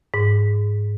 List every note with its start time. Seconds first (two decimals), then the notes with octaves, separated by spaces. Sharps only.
0.14 G#2